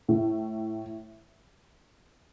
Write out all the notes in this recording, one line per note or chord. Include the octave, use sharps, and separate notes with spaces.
A2